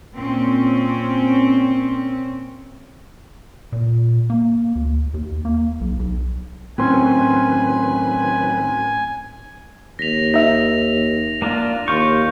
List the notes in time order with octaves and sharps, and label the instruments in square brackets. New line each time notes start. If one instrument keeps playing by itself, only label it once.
[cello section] A#2 C4 C#4
[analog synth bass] A#2
A#3
D2
D#2
A#3
B1
B1
[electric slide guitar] A2 C#4 [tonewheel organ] D#3 F#3 B4 [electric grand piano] C4 C6 [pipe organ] G#5
[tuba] D#2 [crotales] A#6 B6 F7
[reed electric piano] D#4 E5 [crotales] A#6 F7
[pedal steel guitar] A#3 D4 F4
[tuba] D#2 [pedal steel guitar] F4 C#6 [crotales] G6